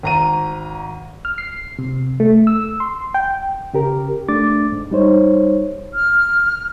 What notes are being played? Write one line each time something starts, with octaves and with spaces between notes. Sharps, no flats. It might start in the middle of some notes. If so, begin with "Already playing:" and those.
G#1 A#5 D#7
F6
C7
C3
A3
E6
C6
G5
C#3 G4 A#4
A3 D4 D6 A6
G#2
G3 D#4 C5 C#5
F6